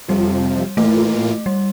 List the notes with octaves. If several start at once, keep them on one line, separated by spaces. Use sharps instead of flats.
F2 C3 F3 G3
A2 E3 A3 A#3 F4
G3